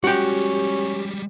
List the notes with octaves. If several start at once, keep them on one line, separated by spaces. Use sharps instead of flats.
G3 G#3 C#4 F#4 G4 G5